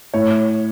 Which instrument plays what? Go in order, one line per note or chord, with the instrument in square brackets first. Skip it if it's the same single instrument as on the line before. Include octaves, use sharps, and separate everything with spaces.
[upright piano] A2 C#5